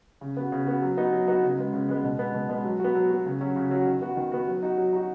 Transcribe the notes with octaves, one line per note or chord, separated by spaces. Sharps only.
C#3
B3 F#4
C#3
B3 F#4
F#3
B3 D#4 F#4
F#3
B3 D#4 F#4
C#3
G#3 B3
C#3
G#3 B3
B2
G#3 B3
B2
G#3 B3
F#3
B3 F#4
F#3
B3 F#4
C#3
F#3 C#4 F#4
C#3
F#3 C#4 F#4
D#3
B3 F#4
D#3
B3 F#4
F#3
D#4 F#4
F#3
D#4 F#4